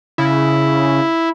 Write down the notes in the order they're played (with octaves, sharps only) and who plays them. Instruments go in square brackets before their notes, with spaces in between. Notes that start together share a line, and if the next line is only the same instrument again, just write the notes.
[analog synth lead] C#3 [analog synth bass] E4